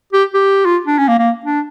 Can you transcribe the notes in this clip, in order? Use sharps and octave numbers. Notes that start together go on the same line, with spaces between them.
G4
G4
F4
D4
C#4
A#3
A#3
D4